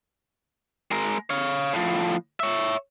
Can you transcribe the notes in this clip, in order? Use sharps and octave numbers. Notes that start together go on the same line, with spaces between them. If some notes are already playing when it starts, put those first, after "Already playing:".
G#3 A#4
C#5 F5
A2 F3
C#5 E5